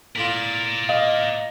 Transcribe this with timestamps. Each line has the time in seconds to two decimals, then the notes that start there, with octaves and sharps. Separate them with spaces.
0.16 A2 F4 A#4 D5 B6
0.89 D#5 F5